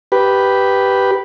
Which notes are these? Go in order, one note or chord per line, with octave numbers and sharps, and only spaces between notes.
G4 B4